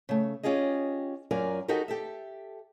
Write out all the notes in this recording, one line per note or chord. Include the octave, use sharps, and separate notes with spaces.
C#3 A3
C#4 F4 G4 G#4 D#5
F#2 F#3 F4 A#4 D5 G#5
D#4 F#4 G4 A4 A#4
G4 A4 E5